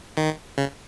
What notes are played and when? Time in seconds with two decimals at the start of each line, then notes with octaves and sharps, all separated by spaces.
0.17 D#3
0.58 C#3